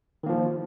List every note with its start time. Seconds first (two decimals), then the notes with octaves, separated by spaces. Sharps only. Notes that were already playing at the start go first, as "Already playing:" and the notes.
0.23 D#3
0.26 A#3
0.29 F3